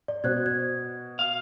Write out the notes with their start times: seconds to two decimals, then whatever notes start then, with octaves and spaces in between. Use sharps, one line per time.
0.08 D5
0.24 B2 C5 F#6 G#6
0.46 G#6
1.19 F5